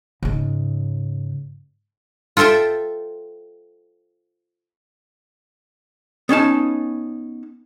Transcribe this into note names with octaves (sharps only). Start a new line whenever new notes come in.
G#2 C#3
F4 A4 C5 E5 G5
B3 C#4 D#4 A5